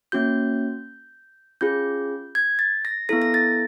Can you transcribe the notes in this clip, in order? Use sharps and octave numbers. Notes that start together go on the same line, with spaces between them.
A#3 C#4 F#4 G6
C#4 F4 G#4 G6
G#6
A6
A#6
B3 E4 A4 A#6
A#6
A6